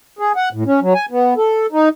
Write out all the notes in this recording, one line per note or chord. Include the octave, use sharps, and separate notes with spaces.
G#4
F#5
A2
C#4
F#3
G#5
B3
A4
D#4